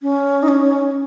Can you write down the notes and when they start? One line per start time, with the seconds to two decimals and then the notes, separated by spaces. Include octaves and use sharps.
0.02 C#4
0.43 D#4
0.48 C#4